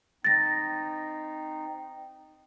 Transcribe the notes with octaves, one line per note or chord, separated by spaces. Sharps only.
C4 D#4 A6 A#6